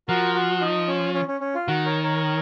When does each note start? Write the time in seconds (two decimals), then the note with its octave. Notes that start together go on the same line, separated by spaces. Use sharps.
0.08 F3 F#4 A#4
0.35 F#4
0.61 D#4
0.88 C#4
1.14 C#4
1.28 C#4
1.41 C#4
1.55 F4
1.67 D#3 F#4
1.86 A#4 C#5
2.03 A#4 C#5